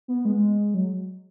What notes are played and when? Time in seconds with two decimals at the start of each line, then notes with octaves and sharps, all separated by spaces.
0.08 B3
0.25 G#3
0.74 F#3